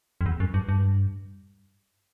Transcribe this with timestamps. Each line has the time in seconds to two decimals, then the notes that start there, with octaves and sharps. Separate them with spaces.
0.21 F2
0.26 E2
0.40 F#2
0.54 G2
0.69 G2